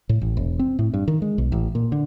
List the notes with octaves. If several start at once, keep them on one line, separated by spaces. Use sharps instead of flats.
A2
A1
E1
C4
A2
G2
D#3
G#3
B1
A1
A#2
D3